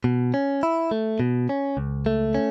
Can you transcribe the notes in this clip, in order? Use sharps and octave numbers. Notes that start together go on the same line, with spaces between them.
B2
C#4
E4
A3
B2
C#4
C#2
A3
C#4